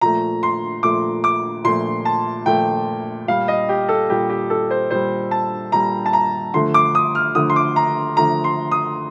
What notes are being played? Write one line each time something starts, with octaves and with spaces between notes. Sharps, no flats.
A#2 F3 A3 A#5
C6
A#2 F3 A3 D6
D6
A#2 F3 A3 C6
A5
A#2 F3 A3 G5
A#2 G3 F5
D#5
G4
A4
A#2 G3 G4
G4
A4
C5
A#2 G3 C5
A5
A#2 G3 A#5
A5
A#5
D3 F3 A3 C6
D6
D#6
F6
D3 F3 A3 D#6
C6
D6
A#5
D3 F3 A3 A#5
C6
D#6